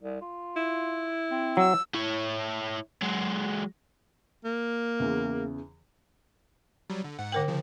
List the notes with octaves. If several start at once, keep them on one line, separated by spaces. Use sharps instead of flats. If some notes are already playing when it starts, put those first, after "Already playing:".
C2
F4
E4
C4
F#3 E6
E4 C#5
F#3 G#3
A#3
E2 C#3 E3
F#3 G3
D3
G#2 F#5
D3 A#4 G5
C#3 F3